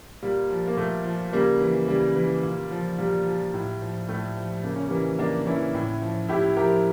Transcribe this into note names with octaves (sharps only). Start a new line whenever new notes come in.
A#2 G3
F3
A#3
A#2 A3
F3
C#3 G3 A#3
E3
C#3 G3
E3
A#2
F3
A#2 G3
F3
A2
F3
A2 A3
F3
C#3 A#3
C#4
E3 G3 A#3
C#3 A#3 D4
E3 C#4 E4
A2
F3
A2 E4 G4
F3 G4 A#4